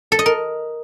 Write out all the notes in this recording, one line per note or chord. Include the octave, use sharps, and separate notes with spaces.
A4
D#5
A#4